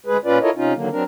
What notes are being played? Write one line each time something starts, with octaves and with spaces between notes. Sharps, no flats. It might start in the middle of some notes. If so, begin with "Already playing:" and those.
D2 G#3 G#4 B4
A#2 C#4 F4 B4 D5
E4 F4 A4 A#4 C#5 D#5
C3 C#4 D#4 F4
D3 D#3 F#3 A#3
F#3 C4 D4 A#4